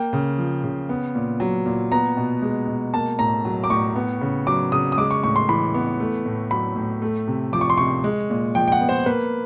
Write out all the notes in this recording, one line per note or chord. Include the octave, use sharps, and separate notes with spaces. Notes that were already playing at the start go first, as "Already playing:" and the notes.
Already playing: A#3 G5
C#3
F3
C#3
B3
A#2
F#3
A#2
B3 A#5
B2
G#3
B2
A#3 A5
A2 A#5
F#3
D6
A2 C#6
B3
C#3
F#3 D6
C#3 D#6
D#6
G#3 D6
C#6
A2 C#6
C6
E3 B5
B3
A3
A2
F#3 B5
A2
A3
C3
F3 D6
C#6
C6
C3 C#6
G#3
A#2
F3 G5
G5
F#5
B3
C5
A#3 B4